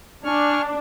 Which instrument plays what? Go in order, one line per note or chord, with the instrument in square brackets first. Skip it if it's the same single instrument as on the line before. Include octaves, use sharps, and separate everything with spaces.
[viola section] D4 [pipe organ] G#5 C#6 F6